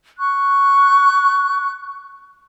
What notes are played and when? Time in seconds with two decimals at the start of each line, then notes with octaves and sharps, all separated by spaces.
0.18 C#6 F#6